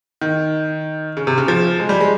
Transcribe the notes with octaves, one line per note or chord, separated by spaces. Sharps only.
D#3
C#3
C3
C#3
F3
G#3
G3
G#3